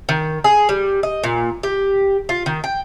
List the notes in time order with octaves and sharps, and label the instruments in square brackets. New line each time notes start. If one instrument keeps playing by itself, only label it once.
[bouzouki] D#3
G#4
G3
D#5
A#2
G4
F4
D#3
G5